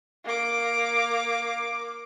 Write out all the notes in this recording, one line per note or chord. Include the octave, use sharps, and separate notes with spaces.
A#3 D6